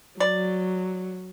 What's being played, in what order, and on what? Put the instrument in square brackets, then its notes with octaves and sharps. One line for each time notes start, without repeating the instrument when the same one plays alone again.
[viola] F#3 [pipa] D5